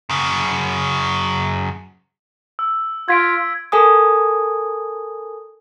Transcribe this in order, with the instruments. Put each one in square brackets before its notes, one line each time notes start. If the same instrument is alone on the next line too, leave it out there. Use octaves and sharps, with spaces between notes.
[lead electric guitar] F#2 C#3
[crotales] E6
[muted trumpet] F4 [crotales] G#6 B6 D7
[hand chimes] A4 A#4 G#5 D#6